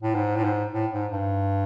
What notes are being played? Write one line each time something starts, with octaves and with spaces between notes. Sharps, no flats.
A2
G#2
A2
G#2
A2
G#2
G2